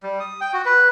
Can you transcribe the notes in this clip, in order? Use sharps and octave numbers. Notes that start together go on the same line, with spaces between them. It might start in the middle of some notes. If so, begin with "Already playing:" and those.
G3
D#6
G5
F#4
B4